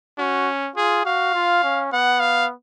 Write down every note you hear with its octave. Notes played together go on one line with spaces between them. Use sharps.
C#4 F#4
F4 G#4
F#4 F5
F4
C#4
B3 F#5
F5